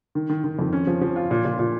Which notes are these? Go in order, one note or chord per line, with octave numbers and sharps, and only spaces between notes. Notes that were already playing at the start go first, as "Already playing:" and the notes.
D#3
D#3
D#3
F2
C#4
F3
F3
F4
A#2
A#2
A#2